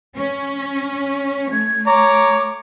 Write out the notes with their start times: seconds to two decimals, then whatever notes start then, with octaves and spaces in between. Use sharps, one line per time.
0.16 C#4
1.52 A3 G#6
1.86 C#5 A#5 D6